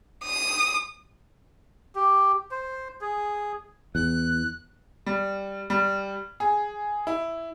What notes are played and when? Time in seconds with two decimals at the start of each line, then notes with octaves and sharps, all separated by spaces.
0.25 D#6
1.95 G4
2.51 C5
3.01 G#4
3.95 E2 F#6
5.06 G3
5.70 G3
6.40 G#4
7.07 E4